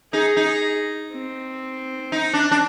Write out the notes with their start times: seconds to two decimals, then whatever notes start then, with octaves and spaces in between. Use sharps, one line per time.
0.13 D#4 G#4
0.37 D#4
0.47 G#4
1.13 C4
2.12 D#4
2.34 D4
2.51 D4